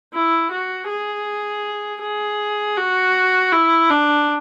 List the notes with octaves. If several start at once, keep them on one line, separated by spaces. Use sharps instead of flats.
E4
F#4
G#4
G#4
F#4
E4
D4